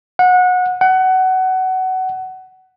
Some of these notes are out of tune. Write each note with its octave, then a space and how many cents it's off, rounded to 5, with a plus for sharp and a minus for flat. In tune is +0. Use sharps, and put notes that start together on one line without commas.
F#5 -25
F#5 +20